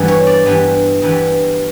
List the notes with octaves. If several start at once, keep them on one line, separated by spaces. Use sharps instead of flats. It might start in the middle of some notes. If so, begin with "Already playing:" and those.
Already playing: G2 E3 G3 B3
C#5
D5
G2 E3 G3 B3
G2 E3 G3 B3